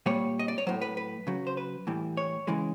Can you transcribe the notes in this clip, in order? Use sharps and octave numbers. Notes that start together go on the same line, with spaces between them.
A#2 G3 C#5
D#5
D5
C#5
A2 F#3 C5
B4
B4
C#3 F#3
C5
B4
A2 E3 G3
C#5
C#3 E3 G#3